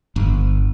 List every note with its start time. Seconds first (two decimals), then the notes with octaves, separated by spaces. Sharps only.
0.16 G1